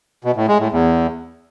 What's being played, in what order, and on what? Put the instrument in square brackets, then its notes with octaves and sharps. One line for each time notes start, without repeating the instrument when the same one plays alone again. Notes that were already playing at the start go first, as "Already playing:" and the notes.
[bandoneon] B2
A2
G#3
A2
E2